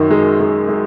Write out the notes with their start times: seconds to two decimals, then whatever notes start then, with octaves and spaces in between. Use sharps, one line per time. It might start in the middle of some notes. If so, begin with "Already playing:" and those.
Already playing: F#2 D#3
0.11 G#3
0.40 G#3
0.69 G#3